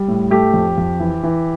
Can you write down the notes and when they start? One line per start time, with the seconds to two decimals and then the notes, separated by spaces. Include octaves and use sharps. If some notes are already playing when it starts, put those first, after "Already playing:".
Already playing: G3
0.08 A2
0.31 A3 G4
0.54 F2
0.78 F2
1.00 E3
1.23 E3